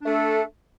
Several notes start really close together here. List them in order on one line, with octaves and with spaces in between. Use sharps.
D4 A3 A4